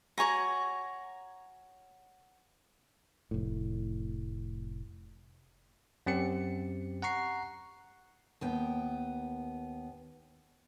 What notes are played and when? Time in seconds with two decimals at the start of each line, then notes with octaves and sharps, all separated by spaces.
0.18 F#4 C#5 G#5 A#5
3.31 F1 A2
6.06 F#2 C4 G4 C#7
7.02 F#5 A#5 C#6 C7
8.41 D#2 B3 G5